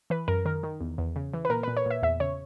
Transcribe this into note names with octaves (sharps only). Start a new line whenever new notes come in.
E3 B4
F#2 A#4
D#3 A#4
D#3
E2
E2
C#3
E3
B4
A#2 A#4
A#2 B4
C#5
A#2 E5
E2 E5
C#3 C#5